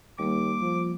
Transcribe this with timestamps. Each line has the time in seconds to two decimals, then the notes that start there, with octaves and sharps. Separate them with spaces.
0.18 D#2 G3 A#3 D6
0.61 F3